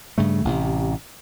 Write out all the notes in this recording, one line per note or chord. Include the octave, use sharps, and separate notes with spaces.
G2 C#3 A3
A1 C3